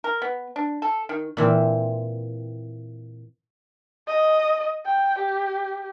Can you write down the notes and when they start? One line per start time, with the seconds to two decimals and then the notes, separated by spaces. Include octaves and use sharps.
0.04 A#4
0.22 B3
0.56 D4
0.82 A4
1.09 D#3
1.37 A#2 E3 C4
4.07 D#5
4.85 G5
5.19 G4